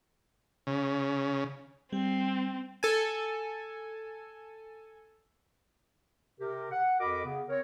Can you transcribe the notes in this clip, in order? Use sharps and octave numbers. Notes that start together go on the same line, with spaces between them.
C#3
G3 C4
A4 G#5
C3 G4 A#4
F#5
F2 F#4 A#4 D#5 B5 D6
C#3 B3
C4 A#4 C#5